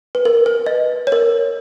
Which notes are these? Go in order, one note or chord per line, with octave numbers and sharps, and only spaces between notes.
B4
A#4
B4
D#5
C#5
A#4